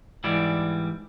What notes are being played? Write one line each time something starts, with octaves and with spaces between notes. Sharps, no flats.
G#2 E3 G3 E4 D5